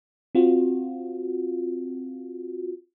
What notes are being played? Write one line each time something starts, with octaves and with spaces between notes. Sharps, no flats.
C4 F4 F#4